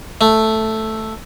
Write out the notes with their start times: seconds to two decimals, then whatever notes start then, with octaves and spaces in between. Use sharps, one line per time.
0.21 A3